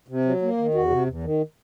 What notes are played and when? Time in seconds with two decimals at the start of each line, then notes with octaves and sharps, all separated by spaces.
0.08 C3
0.25 F#3
0.42 A#3
0.58 D#3
0.74 E2 F#4
0.90 C3
1.07 E2
1.23 D#3